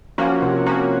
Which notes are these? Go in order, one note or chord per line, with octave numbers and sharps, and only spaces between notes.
F3 A#3 C#4 F#4
C3
F3 A#3 C#4 F#4